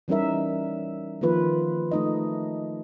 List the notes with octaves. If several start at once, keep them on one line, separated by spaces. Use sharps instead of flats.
E3 G3 C#4 D#4 A#4 E5
D#3 F3 A#3 F4 B4
A3 D#4 D#5